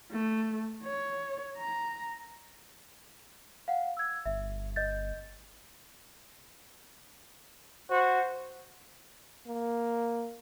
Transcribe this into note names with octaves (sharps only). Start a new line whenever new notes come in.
A3
C#5
A#5
F5 F#5
E6 G#6
G1 E5
D#5 G6 A6
F#4 C5
A#3